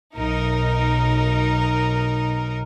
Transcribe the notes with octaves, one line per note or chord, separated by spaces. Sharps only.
B1 D#4 A#4